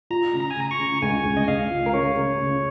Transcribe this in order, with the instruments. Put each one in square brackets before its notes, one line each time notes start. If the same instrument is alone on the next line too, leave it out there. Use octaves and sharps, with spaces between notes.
[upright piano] F4 [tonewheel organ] A#5
[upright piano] C#3
[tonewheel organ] A#5
G#5
[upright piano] C#3 [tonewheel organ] A#5
[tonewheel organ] C#6
[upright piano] C#3
[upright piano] C#2 [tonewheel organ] G#5
[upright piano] C#2
[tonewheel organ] D#5
[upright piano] C#2 [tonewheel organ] F5
[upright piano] F4
[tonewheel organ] A#4
[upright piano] C#3 [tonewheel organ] C#5
[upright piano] C#3
C#3